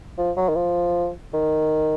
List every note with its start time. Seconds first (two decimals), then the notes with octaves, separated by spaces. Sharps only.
0.18 F3
0.37 F#3
0.49 D#3
0.55 F3
1.33 D#3